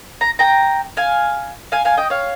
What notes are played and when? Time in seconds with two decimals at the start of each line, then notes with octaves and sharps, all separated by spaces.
0.21 A#5
0.39 G5 A#5
0.97 F5 G#5
1.72 F5 G#5
1.85 F5 G#5
1.97 D#5 G5
2.10 C#5 F5